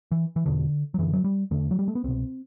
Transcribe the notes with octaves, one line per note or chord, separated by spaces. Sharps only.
E3
E3
E2 B2 D3
F#3
F#2 D3 E3
F#3
G3
E2 D3 A3
F#3
G3
A3
B3
C2 B2 C4